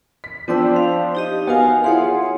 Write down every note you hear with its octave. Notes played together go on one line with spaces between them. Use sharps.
B6
F3 B3 C4 D4 G5 E6
F5
D#4 G4 D#5
B3 F#4 A#4 F5 G#5
E4 F4 G#4 C#5 F#5 C6